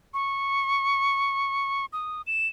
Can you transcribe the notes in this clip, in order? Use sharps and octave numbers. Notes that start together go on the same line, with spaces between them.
C#6
D#6
E7